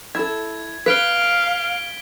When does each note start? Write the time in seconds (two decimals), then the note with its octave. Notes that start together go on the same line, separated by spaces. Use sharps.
0.15 E4 A4 G#6
0.86 B4 F5 B6 D7 G7